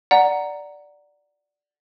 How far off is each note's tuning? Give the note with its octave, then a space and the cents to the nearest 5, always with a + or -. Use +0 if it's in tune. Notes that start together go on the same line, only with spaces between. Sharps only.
D5 +0 F#5 +5 A#5 +0